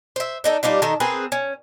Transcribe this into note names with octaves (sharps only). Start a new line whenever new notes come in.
C5 E5
D4 D#4 A4
G3 D4 D#4 F4
D#3 D#4 A4 A#4
C4 G#4 A#4 B4
C#4